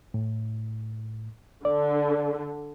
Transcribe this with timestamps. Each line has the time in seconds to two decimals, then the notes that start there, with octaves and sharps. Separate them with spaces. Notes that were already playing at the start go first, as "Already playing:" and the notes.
0.14 A2
1.65 D3 D5